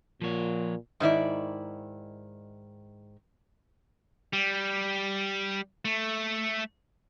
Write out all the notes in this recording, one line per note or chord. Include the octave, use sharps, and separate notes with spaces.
A#2 F3 C#5
G#2 D#3 E4 D5
G3
A3